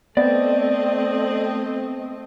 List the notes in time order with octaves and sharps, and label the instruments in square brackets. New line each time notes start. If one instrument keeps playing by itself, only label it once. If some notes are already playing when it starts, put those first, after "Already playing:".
[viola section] A3 C4 D#5 [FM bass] B3 [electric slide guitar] D5